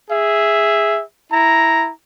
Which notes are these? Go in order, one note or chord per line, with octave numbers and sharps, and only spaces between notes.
G#4 E5
E4 A#5